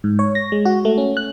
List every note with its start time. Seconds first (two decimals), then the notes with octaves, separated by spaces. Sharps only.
0.04 G#2
0.19 C#5
0.35 A#6
0.52 G#3
0.65 F#4
0.85 A3
0.98 C#4
1.17 F#6